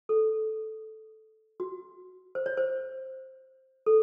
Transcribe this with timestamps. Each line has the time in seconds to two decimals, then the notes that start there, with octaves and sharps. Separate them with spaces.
0.09 A4
1.60 F#4
2.35 C5
2.46 C#5
2.57 C5
3.86 A4